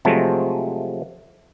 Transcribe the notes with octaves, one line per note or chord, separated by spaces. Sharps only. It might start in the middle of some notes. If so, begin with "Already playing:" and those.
C3 F3 F#3 G#3 A3